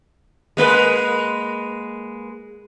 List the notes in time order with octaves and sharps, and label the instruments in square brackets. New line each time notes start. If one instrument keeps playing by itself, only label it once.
[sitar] G#3 A#3 B4